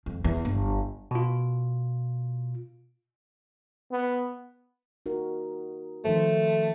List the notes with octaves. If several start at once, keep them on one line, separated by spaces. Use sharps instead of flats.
F2
E2
G1
B2 F4
B3
D#4 F#4 A#4
D#3 F3 A3 C5